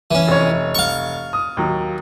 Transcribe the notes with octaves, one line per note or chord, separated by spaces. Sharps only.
E3 C#4
F1 C#5
F5 C#6
D#6
D#2 F#3